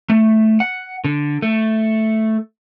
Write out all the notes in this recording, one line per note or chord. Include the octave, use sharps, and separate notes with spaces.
A3
F#5
D3
A3